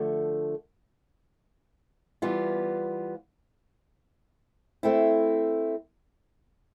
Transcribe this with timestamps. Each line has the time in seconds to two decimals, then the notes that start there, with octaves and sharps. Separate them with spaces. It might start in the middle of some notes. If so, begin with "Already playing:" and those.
Already playing: D3 F3 A3
2.22 E3 G3 B3 F4
4.83 A3 C4 E4